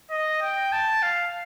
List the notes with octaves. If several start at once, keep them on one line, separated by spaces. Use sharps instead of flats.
D#5
G5
A5
F5